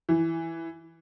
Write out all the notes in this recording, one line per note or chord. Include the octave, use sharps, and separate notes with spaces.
E3